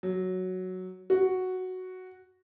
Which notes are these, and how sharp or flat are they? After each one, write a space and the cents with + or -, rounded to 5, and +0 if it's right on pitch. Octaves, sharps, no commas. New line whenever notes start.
F#3 +0
F#4 +0